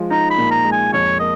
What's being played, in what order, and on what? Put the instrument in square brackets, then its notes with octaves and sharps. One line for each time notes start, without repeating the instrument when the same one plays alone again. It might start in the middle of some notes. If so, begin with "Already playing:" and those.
Already playing: [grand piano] F3 G#3
[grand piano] D#4 [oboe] A#5
[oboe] B5
[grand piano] A#2
[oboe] A#5
[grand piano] G#3
[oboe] G#5
[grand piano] F2 [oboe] C#5
[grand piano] A#3 [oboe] D#5